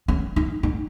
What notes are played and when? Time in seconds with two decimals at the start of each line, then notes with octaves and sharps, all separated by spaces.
0.08 C#4
0.36 D#4
0.63 D#4